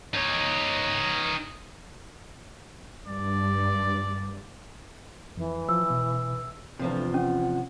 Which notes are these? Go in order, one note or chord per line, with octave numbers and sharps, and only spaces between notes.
D#4 C#5
G2 D5
F2 E3
F3 E6
B2
E2 C3 F3 A3 D4 F4
C#4 F#5